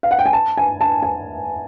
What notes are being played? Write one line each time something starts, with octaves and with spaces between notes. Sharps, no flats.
F5
F#5
G5
G#5
A5
G#5
A5
G#5